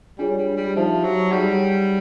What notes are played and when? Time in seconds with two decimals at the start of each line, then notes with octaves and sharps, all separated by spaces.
0.18 G3 D4 F4 G#4 C#5
0.38 G3
0.57 G3
0.76 F3 D#4 G4 C5 E5 A5
1.04 F#3
1.32 G3 D#4 G#4 C#5 F#5 A#5